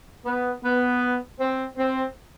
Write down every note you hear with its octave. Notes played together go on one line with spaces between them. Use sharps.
B3
B3
C4
C4